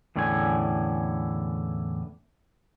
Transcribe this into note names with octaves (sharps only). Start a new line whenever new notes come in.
E2 A2 D3 C#4 F4 G#5